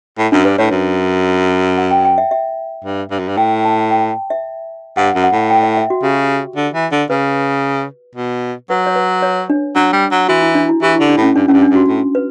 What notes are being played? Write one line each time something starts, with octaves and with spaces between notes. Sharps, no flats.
A2
F#2 D4
G2 B4
A2 C#5
F#2
F#5
G5
G5
E5
E5
G2
G2
F#2
G2
A2 G5
A5
G5
E5
G2 F#5
F#2
F#5
A2
G5
E5
E5
F#4
C#3 G4
D3
E3
D3
C#3 B4
B2
F#3 B4
C#5
B4
C#5
D4
F#3 D4
G3
F#3
E3 F#4
E4
D4
E4
E3 G4
E4
D3
D4
A2 C#4
G2 D4
A2 C#4
G2
D4
G2
F#4
A2
B4